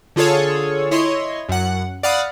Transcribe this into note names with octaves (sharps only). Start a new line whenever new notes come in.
D3 F4 G#4 A4 C#5
E4 C#5 D#5 C6
F#2 F#5
D5 F5 F#5 B5 D#6